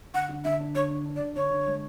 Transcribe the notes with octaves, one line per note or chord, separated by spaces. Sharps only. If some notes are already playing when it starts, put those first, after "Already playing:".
D3 F#5
D3
D3 E5
D4
D3 C#5
D4
D4
D5
D3
D3 C#5
D3
G#3